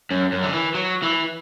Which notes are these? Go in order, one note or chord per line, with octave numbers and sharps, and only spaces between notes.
F#2
F#2
D3
E3
F#3
E3